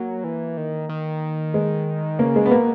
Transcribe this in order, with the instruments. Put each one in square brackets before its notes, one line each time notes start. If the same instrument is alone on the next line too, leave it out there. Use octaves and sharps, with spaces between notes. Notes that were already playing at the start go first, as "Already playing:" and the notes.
Already playing: [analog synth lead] F#3 [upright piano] A#3
[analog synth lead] E3
D#3
D#3
[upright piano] G#3
[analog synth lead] C#3 [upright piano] A#3
[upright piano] G#3
B3
[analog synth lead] B2 [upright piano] A#3